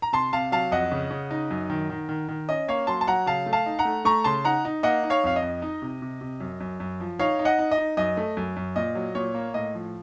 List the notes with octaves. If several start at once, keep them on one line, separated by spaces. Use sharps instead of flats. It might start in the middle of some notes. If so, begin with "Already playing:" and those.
A#5
C3 A5 C6
C3 F5 A5
F#3 F5 A5
F2 D#5 F#5
C#3
C#3
D#4
F#2
D#3
D#3
D#3
D#3
C#4 D#5
A#3 C#5 F5
F#3 A5 C6
A5
F#3 F#5 A#5
C#3 F5 A5
A3
F5 A5
D#4
F#5 A#5
A3
A3 A#5 C#6
C#3 A5 C6
D#4 F#5 A#5
D#4
A#3 D#5 F#5
D#4
C#5 F5
F2 F5
D#5
F2
D#4
C3
C3
C3
F#2
F#2
F#2
F3
D#4 C#5 F5
D#4
D#5 F#5
D#4
D#5
D#4
F#2 D#5
A3
F#2
F#2
A#2 D#5
F#3
A#2 C#5
A#3
A2 D#5
F3